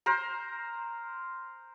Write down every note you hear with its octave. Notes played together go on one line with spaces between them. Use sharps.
A#4 C5